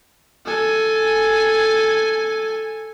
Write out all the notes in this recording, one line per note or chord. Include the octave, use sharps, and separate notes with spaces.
A4 G#5